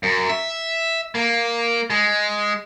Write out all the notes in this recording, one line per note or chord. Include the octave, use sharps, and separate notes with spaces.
F#2
E5
A#3
G#3